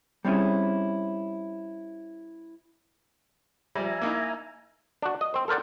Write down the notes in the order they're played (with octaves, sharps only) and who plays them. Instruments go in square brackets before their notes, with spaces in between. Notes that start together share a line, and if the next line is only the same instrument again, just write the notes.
[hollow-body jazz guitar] G3 C4 C#4 E4 G#4
[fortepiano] F3 G3 [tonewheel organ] E5 G#5 A#5
[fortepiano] A#3 D#4 E4
[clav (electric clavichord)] D4 F#4
D#5
C4 C5
A4 A#4 C5 D5 F#5